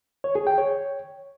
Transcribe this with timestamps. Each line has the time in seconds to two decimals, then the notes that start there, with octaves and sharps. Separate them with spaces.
0.24 C#5
0.35 G#4
0.47 G5
0.58 C#5